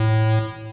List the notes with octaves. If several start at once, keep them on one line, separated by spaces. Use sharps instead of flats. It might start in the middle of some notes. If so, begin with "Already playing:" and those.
Already playing: A2